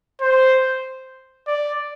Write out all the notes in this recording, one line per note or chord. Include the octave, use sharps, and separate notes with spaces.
C5
D5